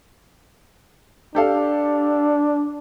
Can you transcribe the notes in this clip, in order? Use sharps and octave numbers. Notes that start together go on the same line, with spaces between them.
D4 G4 A4 F5